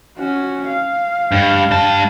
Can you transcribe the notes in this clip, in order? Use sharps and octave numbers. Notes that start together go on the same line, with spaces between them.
C#4 F#4
F5
G2
G2 A5